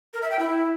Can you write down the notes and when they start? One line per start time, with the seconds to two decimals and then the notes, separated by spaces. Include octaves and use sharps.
0.14 A#4
0.22 E5
0.31 G5
0.39 E4